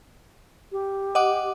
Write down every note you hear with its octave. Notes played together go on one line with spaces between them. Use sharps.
G4
D#5 F#5 D6